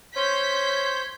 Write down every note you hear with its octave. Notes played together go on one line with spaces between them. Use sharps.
C#4 C5 C#5 C6 G6 G#6 B6